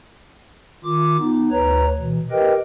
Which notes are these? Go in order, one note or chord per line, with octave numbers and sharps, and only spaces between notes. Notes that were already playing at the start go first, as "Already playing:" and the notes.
D#3 F4 D6
B3 D#4
D2 B4 C#5 A#5
B2 E3
G4 A#4 B4 D#5 G5